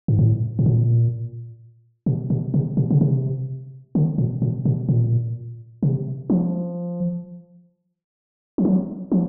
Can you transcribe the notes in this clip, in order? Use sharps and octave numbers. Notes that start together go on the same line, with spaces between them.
G#2
A2
A2
A#2
B2
B2
C3
B2
C#3
C3
D3
A#2
A#2
B2
A#2
C3
F3
F3
F#3
F3